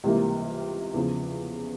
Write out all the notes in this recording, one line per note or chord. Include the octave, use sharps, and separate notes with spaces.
C#2 C3 E3 G3 A#3
E2 C#3 F3